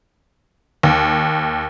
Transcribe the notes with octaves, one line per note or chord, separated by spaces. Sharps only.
D#2